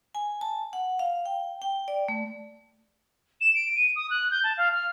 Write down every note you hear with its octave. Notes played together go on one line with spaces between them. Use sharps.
G#5
A5
F#5
F5
G5
G5
D5
A3
E7
D7
D#7
D#6
F#6
G6
A5
F5
F6